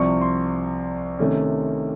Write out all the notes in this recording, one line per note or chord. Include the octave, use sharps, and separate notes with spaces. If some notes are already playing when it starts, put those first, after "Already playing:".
Already playing: C2 C3 F3 C#6
C6
C3 D#3 A3 C#4